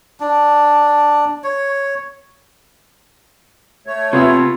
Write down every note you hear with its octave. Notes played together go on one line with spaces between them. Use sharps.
D4
C#5
A3 C#5
C3 B3 F4 E5